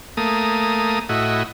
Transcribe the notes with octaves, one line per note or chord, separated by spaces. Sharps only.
A3 A#3 D#6
A2 E4 F#4 D#5